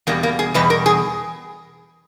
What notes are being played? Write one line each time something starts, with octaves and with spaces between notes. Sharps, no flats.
E2 B2 G3 A#3
A#3
G#4
E2 B2 G3 B4
A#4
G#4